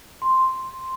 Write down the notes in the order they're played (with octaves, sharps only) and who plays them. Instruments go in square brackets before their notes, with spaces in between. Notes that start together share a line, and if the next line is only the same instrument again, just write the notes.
[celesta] C6